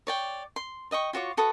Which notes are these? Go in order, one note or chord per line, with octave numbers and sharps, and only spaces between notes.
C#5 D5 G5
C6
D5 D#5 G5 C#6
F4 F#4 C#5 D6
F#4 A4 B4 D#6